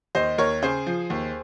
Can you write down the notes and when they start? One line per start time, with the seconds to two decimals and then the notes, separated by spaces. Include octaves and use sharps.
0.15 D#2 C5 D#5
0.38 D#2 A#4 C#5
0.62 C#3 G#4 C5
0.86 F3
1.10 D#2